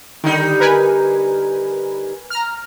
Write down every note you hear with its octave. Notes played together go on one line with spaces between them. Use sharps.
D3 D#3 G3 D#4
A#4 B4 G#5
A#5 F6